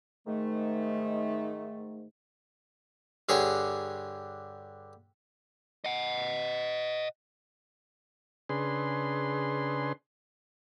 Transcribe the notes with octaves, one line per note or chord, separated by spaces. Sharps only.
G#2 D#3 A3
G2 D3 G#4 C#5
D#5 F#5
C#3 D4 G#4 B4 C6